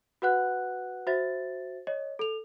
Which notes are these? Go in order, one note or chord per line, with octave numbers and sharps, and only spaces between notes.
F#4 B4 F#5 F#6
F#4 C5 E5 A6
C#5 D#5
A4 F7